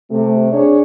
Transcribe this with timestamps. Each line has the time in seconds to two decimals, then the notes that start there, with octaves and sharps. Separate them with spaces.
0.10 C3 A3
0.52 D4 G#4 C#5